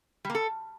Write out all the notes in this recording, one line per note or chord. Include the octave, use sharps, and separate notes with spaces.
G3
A#3
A4